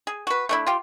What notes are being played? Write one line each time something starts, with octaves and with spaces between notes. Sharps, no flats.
G#4
F#4 B4
A3 D4 E4
F4 G4